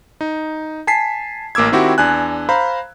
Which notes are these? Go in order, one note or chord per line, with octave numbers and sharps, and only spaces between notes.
D#4
G#5 A5 B6 C7
A1 A#3 D6 E6 G#6
D#3 C4 E4 F#4 G4
E2 D4 G#5 F#6
C5 F5 A#5 B5